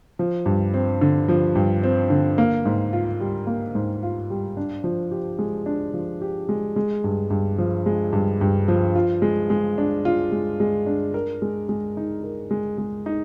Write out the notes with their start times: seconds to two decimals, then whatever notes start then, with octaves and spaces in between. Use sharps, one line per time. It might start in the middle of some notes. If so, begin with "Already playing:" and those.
0.19 F3
0.46 G2
0.74 C4
1.01 D3
1.28 F3
1.55 G2
1.83 C4
2.10 D3
2.38 A#3
2.65 G#2
2.93 F4
3.20 G3
3.47 A#3
3.75 G#2
4.03 F4
4.30 G3
4.57 D4
4.84 F3
5.11 G4
5.39 G#3
5.66 D4
5.94 F3
6.21 G4
6.49 G#3
6.76 G#3
7.04 G2
7.30 G2
7.58 F3
7.86 G#3
8.13 G2
8.41 G2
8.68 F3
8.95 F4
9.22 G#3
9.50 G#3
9.78 D4
10.05 F4
10.32 G#3
10.60 G#3
10.86 D4
11.14 A#4
11.42 G#3
11.69 G#3
11.97 D#4
12.24 A#4
12.51 G#3
12.78 G#3
13.06 D#4